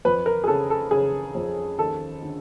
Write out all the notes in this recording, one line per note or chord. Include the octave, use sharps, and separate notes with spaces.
F2 B4
A#4
G#4
C#3 A4
A4
C#3 G#4
F2
D#2 A4
D3